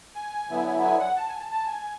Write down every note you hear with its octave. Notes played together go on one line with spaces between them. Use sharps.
G#5
D3 F#3 B3 E4
G#5
F#5
A5
G#5
A5
A5
G#5